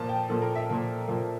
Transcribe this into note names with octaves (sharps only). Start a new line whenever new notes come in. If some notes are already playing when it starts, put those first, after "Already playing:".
Already playing: A#2 F3 A#3 A5
G5
A#2 F3 A#3 A4
A#4
E5
A#2 F3 A#3
A#2 F3 A#3